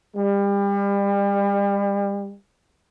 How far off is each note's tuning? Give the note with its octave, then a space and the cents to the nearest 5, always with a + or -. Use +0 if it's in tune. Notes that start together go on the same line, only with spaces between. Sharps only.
G3 +35